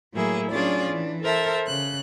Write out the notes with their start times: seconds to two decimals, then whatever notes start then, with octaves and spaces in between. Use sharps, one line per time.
0.13 A2 F#3 A#3 E4 G#4
0.51 F#3 C#4 D4 F4 G#4 D5
0.90 E3 D4
1.22 A4 A#4 C5 E5 A5
1.67 C#3 F#6